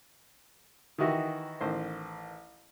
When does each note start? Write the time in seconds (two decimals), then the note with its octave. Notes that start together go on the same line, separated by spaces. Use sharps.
0.98 D#3 E3 D#4 E4 F#4 G4
1.61 A1 D#3 C5